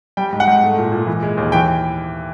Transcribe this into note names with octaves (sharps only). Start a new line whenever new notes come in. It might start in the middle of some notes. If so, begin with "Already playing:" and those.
G3 G5
G#2
F#5
G#2
A3
A#2
A#2
E3
G#3
D#2
E3 G5